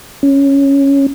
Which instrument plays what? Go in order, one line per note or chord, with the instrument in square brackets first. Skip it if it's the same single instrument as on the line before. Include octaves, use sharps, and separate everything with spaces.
[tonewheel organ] C#4